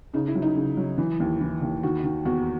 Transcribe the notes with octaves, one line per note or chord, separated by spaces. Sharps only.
C#3 D#4
E4
F#3
D#4
C#3
F#3
E3
D#2
E3
D#2
D#3 F#4
D#3
E2 F#4